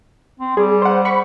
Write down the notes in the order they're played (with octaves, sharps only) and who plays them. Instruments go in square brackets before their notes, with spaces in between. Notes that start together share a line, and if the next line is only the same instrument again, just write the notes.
[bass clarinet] C4
[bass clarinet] G3 [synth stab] G#4
[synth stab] C5 F#5
B5 C#6